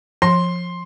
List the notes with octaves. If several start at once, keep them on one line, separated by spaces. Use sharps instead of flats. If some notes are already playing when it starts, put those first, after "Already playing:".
F3 C6